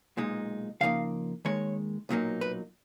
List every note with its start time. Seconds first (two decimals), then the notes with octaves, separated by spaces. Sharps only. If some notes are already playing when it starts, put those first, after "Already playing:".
0.17 B1 A#2 G#3 D#4
0.81 C#3 F3 A#3 D#4 F5
1.45 D#2 D#3 G#3 C#5
2.09 B1 A#2 F#3 A#3 D#4
2.41 B4